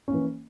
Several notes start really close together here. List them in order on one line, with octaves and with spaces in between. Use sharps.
C#4 A#3 E3